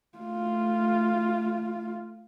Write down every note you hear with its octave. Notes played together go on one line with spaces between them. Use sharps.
A3 F4